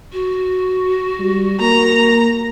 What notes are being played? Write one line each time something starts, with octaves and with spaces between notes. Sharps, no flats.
F#4
G3
A#3 A#5